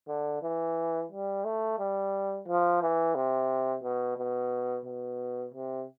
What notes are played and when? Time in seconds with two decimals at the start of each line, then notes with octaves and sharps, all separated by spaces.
0.08 D3
0.43 E3
1.11 G3
1.44 A3
1.79 G3
2.48 F3
2.82 E3
3.15 C3
3.83 B2
4.18 B2
4.86 B2
5.54 C3